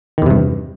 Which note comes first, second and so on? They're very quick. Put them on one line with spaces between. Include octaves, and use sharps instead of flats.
D#3 E2 C3 G2